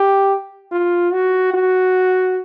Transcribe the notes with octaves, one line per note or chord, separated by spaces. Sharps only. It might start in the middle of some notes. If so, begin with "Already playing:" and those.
Already playing: G4
F4
F#4
F#4